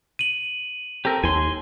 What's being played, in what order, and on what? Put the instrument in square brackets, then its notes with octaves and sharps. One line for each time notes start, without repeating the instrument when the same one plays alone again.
[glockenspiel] D#7 F#7
[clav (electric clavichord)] C4 A4 [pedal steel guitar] G4 A#4
[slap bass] D#2 [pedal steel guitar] G#5 C6